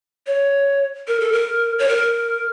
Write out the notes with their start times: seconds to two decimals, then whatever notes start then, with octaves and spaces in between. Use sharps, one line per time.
0.27 C#5
1.08 A#4
1.20 A4
1.32 A#4
1.79 C#5
1.89 A#4